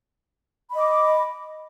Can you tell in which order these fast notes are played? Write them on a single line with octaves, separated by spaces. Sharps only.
B5 D#5 D6